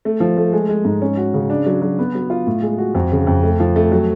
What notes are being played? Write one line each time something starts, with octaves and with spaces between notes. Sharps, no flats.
A3
F3
A3
G#3
G#3
G#2
C#4
F#4
C#3
D4
F#3
F#3
B3
F#3
F4
A2
G#3
F#4
F2
C#3
F2
A3
F3
A3
F#3